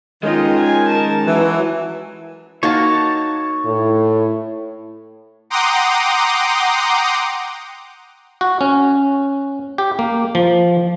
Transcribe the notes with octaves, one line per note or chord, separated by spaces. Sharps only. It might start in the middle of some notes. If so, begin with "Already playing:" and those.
D#3 G#3 C#4 D#4 F4 D#5
G#5
A#4 A5
E3 F#3
A#3 D#4 F#4 C#5 A5
A2
F#5 G5 A#5 C6 D6 D#6
F#4
C#4
G4
A#3
F3